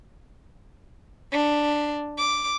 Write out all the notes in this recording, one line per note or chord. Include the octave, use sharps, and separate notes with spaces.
D4
D6